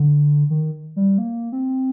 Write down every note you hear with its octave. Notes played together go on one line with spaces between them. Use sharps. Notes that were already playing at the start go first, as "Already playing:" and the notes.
Already playing: D3
D#3
G3
A#3
C4